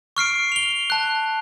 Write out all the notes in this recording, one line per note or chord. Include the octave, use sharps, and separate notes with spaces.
C#6 F6 C7 D7
F7 G7
A5 F#6